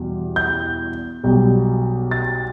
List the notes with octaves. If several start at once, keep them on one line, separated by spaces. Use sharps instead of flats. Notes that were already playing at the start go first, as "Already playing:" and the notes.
Already playing: E2 B2 G3
G6
B1 B2 G3
A6